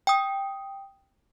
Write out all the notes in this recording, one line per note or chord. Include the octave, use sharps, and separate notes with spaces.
G5 D#6